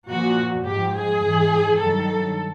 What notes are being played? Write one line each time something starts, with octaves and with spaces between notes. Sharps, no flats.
A#2 F3 F#4
G#2 F3 G4
G#4
G#2 E3
G2 D#3 F#3 A4